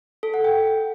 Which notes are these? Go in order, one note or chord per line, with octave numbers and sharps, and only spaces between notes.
A4
F#5
G5